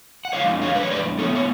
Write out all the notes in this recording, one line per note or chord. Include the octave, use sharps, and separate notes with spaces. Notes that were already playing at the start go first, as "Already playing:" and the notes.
F#5
F3 G#3 D4 C#5 F5
C#5 F5
B4
C#5
B4 D5
A2 G#3 B3 A4 C#5
C#5